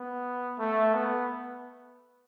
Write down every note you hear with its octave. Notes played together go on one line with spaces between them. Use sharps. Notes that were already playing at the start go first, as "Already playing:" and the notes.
Already playing: B3
A3
B3